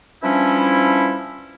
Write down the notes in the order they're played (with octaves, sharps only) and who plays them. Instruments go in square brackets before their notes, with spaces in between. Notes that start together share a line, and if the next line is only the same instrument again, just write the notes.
[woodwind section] E3 F3 G3 C#4 D4 E4